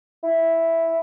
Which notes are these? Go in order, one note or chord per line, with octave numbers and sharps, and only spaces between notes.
E4